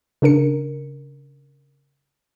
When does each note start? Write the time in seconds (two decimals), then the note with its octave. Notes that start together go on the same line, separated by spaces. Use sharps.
0.22 C#3 D4 A#4 C#7